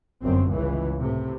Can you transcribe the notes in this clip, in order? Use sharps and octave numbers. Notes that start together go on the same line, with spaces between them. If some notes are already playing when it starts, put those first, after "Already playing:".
G1 F#2 C4
C#2 E3
A2 C3